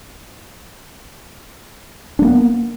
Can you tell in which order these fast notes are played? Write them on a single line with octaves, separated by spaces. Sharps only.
D4 G#3 A#3 B3